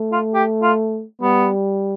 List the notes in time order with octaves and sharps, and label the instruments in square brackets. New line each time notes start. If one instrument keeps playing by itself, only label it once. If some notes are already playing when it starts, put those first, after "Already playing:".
Already playing: [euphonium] A3
[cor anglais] F4
G4
F4
[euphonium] G3 [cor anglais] B3